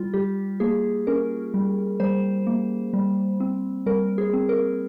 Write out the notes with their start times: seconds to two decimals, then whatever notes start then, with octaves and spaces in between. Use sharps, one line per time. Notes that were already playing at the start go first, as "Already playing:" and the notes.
Already playing: G3 F4
0.14 G3 G4
0.60 A#3 G#4
1.07 C#4 A#4
1.54 G3
2.00 G3 C5
2.47 A#3
2.93 G3
3.40 C4
3.86 G3 A#4
4.18 G#4
4.33 C4
4.49 A#4